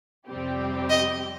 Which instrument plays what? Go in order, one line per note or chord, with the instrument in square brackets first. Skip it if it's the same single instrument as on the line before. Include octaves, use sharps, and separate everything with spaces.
[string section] F2 C3 G3 C4 G4
[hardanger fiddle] D#5